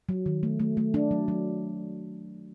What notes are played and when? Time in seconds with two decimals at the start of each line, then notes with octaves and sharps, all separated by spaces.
0.09 F#3
0.26 D#3
0.43 A3
0.60 A3
0.77 A3
0.94 D4
1.11 F#3
1.28 F#3